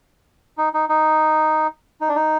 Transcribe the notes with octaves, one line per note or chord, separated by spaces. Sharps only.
D#4
D#4
D#4
D#4
D4
D#4